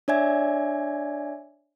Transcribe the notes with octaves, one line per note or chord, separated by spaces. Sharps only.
D4 C#5 D5 E5 G#5 G#6